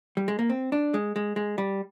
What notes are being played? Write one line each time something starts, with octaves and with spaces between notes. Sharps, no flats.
G3
G#3
A#3
C4
D4
G#3
G#3
G#3
G3